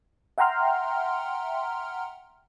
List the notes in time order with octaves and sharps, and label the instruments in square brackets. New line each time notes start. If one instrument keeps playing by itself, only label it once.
[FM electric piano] E5 F#5 G5 A#5 C6 F6